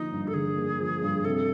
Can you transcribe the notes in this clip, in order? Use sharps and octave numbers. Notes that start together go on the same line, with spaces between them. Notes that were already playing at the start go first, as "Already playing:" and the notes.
Already playing: D3 F3 A#3 D#4
G2
A4
D3 G#4
A#3
F3
G2
C3 A4